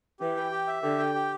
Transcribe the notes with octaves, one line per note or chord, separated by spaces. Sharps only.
E3 G4
G5
G4
E5
D3 G4
G5
G4